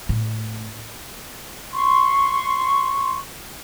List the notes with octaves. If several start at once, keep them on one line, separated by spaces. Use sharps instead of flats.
A2
C6 C#6